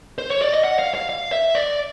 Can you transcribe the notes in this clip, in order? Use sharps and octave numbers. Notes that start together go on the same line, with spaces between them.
C5
C#5
D5
D#5
F#5
F5
F5
F5
E5
D5